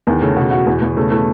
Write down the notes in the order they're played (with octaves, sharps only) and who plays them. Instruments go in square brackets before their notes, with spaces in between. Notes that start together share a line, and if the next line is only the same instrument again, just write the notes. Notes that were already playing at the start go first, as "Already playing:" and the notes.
[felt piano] E2 [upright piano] D#3
[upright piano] C#3 [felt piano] A3
[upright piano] B2 [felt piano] F#4
[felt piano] F#4
E2
E2
[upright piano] C#3 [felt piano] A3
[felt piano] A3